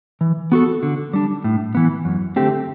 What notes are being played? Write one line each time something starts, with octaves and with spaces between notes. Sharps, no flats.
E3
B3 F#4 A4
D3
G3 D4
A2
E3 B3
F#2
D3 A3 C4 G4